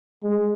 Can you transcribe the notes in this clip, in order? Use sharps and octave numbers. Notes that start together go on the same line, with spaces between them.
G#3